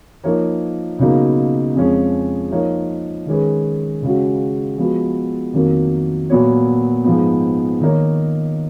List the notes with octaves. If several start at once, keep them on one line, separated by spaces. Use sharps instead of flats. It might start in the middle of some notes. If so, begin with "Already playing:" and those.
F3 A#3 D#4 A#4 C#5
C#2 B2 F#3 A#3 D#4
F2 F3 G#3 C#4
F3 A#3 D#4 A#4 C#5
D#3 G#3 C#4 G#4 B4
C#2 C#3 G#3 C#4 F#4
F3 G#3 B3 F#4 B4
F2 D#3 F#3 A#3
A#2 F#3 B3 F#4 C#5
G#2 F3 B3
D#3 A#3 D#4 A#4 C#5